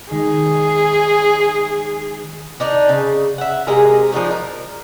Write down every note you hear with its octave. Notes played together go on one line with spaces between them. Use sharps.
D#3 G#3 D#4 G#4
D4 D#4 D5
C#3
E5 F#5
C3 G#3 G#4 A#4
F3 D4 D#4 F#4
A#4